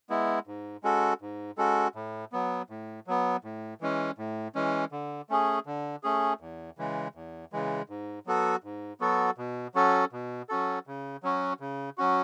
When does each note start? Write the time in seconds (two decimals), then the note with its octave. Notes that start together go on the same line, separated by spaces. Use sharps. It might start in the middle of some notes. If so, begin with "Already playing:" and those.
0.09 G#3 B3 E4
0.47 G#2
0.83 G#3 C#4 F#4 A4
1.22 G#2
1.58 G#3 C#4 F#4 A4
1.95 A2
2.32 F#3 B3
2.70 A2
3.07 F#3 B3
3.44 A2
3.81 E3 G#3 C#4
4.18 A2
4.55 E3 G#3 C#4
4.92 D3
5.29 A3 C#4 G#4
5.66 D3
6.03 A3 C#4 G#4
6.40 E2
6.78 C#3 E3 G#3
7.15 E2
7.53 C#3 E3 G#3
7.90 G#2
8.26 F#3 B3 F#4 A4
8.64 G#2
9.00 F#3 B3 F#4 A4
9.38 B2
9.75 F#3 C#4 F#4 A4
10.12 B2
10.49 F#3 C#4 F#4 A4
10.87 C#3
11.23 F#3 C#4 F#4
11.60 C#3
11.98 F#3 C#4 F#4